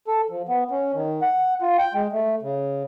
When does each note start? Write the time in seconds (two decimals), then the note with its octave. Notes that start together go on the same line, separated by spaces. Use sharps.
0.07 A4
0.30 F3
0.49 B3
0.71 C#4
0.94 D#3
1.22 F#5
1.61 F4
1.79 G5
1.94 G#3
2.13 A3
2.42 C#3